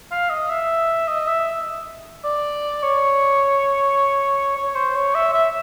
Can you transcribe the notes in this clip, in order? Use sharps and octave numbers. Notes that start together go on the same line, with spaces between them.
F5
D#5
E5
D#5
E5
D5
C#5
C#5
C5
C#5
E5
E5